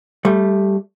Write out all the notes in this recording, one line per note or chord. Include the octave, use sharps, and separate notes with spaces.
G3 A3